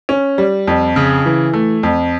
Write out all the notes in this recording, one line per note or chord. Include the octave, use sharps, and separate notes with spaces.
C#4
G3
F2
C#3
E3
A3
F2